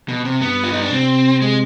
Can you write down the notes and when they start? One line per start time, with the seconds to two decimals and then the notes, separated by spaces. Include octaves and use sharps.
0.08 B2
0.25 C3
0.41 G2 B3
0.64 F4
0.72 D#4
0.82 D4
0.91 C3 C4
1.42 G#3